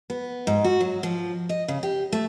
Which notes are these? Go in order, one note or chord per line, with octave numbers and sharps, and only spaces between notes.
B3
G#2
F#4
F#3
F3
D#5
C#3
G4
A3